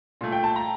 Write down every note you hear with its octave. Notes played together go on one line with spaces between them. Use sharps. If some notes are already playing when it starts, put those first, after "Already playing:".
A#2 A3
G5
A5
A#5